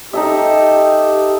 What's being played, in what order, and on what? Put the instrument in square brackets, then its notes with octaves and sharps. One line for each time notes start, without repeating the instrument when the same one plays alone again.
[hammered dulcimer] D#4 A4 E5 [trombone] G4